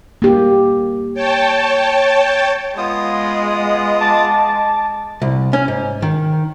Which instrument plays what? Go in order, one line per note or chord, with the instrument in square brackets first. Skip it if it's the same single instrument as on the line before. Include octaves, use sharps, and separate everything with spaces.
[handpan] A#3 G4
[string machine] C#5 G5 A5
[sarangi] G#3 [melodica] B3 F4 D#6
[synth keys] A5 D6 A6
[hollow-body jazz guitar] C2
C#4
G#2
D#3